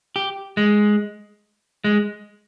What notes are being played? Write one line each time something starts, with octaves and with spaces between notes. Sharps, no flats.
G4
G#3
G#3